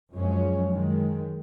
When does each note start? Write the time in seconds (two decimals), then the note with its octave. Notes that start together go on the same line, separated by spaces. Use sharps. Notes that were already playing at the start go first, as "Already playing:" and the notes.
0.12 F#2 F3 G#3 C#4
0.68 F#2 D#3 G#3